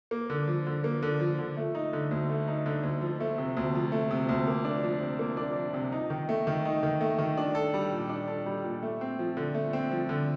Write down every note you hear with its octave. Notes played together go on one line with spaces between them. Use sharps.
A#3
D3
F3
D3
A#3
D3
F3
D3
A3
D#4
D3
D2
A3
D#4
D3
D2
F3
A3
C3
D2
F3
A3
C3
D2
A#3
D4
F3
C3
A#3
D4
F3
C3
D#4
D#3
A3
D#3
D#4
D#3
A3
D#3
D4
A4
G3
A#2
D4
A4
G3
A#2
A3
C4
F3
D3
A3
C4
F3
D3